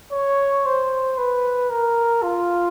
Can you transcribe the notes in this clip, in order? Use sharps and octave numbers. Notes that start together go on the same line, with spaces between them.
C#5
C5
B4
A#4
F4